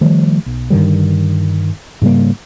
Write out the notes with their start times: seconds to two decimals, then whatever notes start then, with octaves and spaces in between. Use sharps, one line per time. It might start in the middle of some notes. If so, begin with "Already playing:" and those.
0.01 D#3 F3 G3 A3
0.46 B1
0.70 G2 D3 D#3 G3
2.02 G#2 C#3 G3 A#3